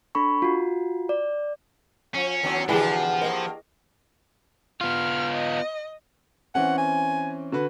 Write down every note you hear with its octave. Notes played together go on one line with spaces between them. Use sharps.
D4 A4 B5 C#6
F4 F#4
D5
F3 C#4
D#2 F#3 D4
B2 D3 E3 F3 D4 G4 G#4
G2 A#3 D#5
B3 F4 F6
D#5
E3 C4 C#4 F#5
G#5
D3 F#4 B4